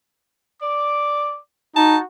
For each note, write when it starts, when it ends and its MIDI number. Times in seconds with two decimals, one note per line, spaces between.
0.62 1.37 74
0.62 1.39 86
1.76 1.98 63
1.76 2.04 66
1.76 1.97 81